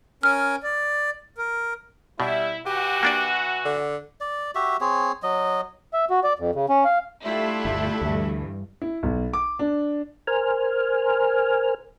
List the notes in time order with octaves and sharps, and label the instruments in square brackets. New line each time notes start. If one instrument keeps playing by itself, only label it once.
[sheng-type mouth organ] C#4 A#4 G#5 [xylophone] F6
[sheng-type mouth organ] D5
A#4
[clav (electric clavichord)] B2 [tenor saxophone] G3 [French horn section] E4
[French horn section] E3 F#4 [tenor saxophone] G4
[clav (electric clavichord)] A#3 D4 D5
[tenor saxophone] D3
[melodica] D5
F#4 G4 E5
C4 G#4 C#5
F#3 D#5
[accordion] E5
F#4
D5
F2
C#3
C#4
F5
[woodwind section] G3 D4 E5 [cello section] A3 F4 G4 [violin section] E4 A4
[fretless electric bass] G1 D2
[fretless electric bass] D2 A3 [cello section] G2 E3
[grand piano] E4
B1
D6
D4
[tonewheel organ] A#4 C5 G#5 F6